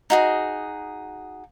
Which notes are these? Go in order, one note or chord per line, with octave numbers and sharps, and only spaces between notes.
D#4 F#4 G#4